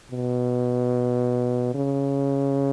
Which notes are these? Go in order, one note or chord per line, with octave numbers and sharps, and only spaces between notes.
B2
C#3